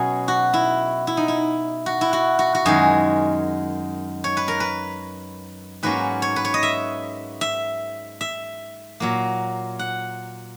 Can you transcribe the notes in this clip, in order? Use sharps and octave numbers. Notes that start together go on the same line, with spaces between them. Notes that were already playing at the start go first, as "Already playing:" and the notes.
Already playing: B2 F#3 C#4 G#4
F#4
E4
E4
D#4
E4
F#4
E4
F#4
F#4
F#4
F#2 D#3 G#3 G#4
C#5
B4
A#4
B4
G#2 F#3 A#3 C#4 B4
C#5
B4
C#5
D#5
E5
E5
E5
A#2 F#3 A#3
F#5